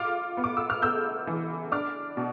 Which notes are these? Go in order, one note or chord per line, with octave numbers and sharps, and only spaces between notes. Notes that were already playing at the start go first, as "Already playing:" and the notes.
Already playing: F4 D6 F6
B3
D6
E6
F6
B3 E6 G6
E3
D4 D6 F6
B2